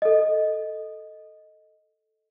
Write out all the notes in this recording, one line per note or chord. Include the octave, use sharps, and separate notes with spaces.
A4 D#5